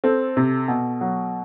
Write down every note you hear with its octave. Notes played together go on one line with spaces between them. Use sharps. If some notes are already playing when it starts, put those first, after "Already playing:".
C4 A4
C3
B2
F#3